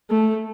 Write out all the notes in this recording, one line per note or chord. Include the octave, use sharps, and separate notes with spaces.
A3